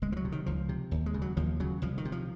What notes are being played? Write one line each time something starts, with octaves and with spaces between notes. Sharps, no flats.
C#2 G#3
F3
F#3
C3
D#3
C#2 F3
C3
D#2
G#3
C#3
F#3
D#2 F3
C#3 F#3
C2 F3
D#3
C3
F3